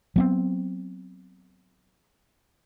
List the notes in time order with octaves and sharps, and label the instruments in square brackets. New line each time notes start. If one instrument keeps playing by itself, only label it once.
[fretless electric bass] F#3 B3 C4